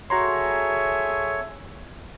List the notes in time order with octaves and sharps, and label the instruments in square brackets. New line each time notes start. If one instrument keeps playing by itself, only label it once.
[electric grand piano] F#4 A#5 C6 [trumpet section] G#4 A4 E5 [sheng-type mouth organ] C#5